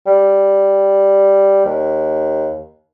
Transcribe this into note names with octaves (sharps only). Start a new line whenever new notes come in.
G3
D#2